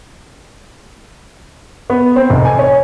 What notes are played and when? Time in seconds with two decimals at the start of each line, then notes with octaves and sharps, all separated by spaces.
1.90 B3
2.16 C4
2.30 F1
2.45 G#5
2.59 C#5